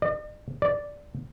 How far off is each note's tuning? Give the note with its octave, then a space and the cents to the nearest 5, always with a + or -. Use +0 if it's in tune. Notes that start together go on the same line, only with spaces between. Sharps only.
D5 +45
D5 -5